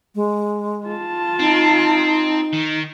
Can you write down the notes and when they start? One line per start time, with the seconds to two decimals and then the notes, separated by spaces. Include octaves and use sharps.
0.16 G#3
0.87 F4 A5
1.40 C4 D#4
2.53 D#3